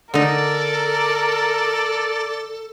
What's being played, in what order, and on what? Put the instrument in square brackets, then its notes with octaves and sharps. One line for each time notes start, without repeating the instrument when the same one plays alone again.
[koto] D3 D#4 [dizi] A4 [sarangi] A#4 [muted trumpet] D5